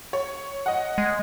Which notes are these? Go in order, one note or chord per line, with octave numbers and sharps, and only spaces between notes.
C#5
D#5 F#5
G#3